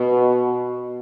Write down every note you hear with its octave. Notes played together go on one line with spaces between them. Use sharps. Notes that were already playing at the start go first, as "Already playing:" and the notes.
Already playing: B2